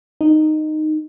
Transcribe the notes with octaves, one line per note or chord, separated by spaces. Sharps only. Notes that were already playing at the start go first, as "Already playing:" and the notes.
D#4